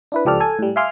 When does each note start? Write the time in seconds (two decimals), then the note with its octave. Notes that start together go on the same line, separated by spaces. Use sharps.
0.12 D4 E4 B4
0.25 C#2 F3 G4 A4 D5 F6
0.40 A4 G#5
0.59 A2 G3
0.76 E5 F5 G#5 C6 D6 F6